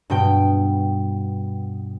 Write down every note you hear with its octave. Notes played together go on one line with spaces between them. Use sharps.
G2 B2 G5